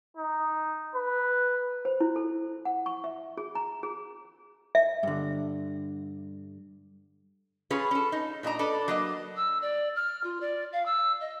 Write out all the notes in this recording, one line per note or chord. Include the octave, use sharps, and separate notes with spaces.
D#4
B4
C5
E4
A4
F#5
C#6
E5
G#4
A#5
G#4
E5
G2 D3
C#4 F4 G#4 B4 C#5
C#4 A4
D#4
A#2 D4 D#5 A#5
D4 A4 B4
F#3 A#3 D#5
E6
D5
F6
F4
D5
F5
E6
D#5